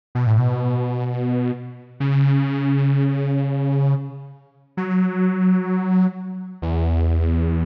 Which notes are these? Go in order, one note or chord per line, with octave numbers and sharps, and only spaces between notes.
B2
A2
B2
C#3
F#3
E2